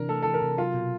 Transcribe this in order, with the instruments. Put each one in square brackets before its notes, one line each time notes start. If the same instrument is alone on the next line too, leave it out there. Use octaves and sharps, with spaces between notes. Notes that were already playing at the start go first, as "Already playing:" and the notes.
Already playing: [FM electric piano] C3 E3 D4 [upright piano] A#4
[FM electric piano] A3 [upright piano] A4
[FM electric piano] E3 [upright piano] A4
[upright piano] A#4
[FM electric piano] C3
[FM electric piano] F#3 [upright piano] F4
[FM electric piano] B2